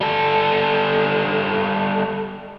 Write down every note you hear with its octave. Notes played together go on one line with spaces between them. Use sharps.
G3 A4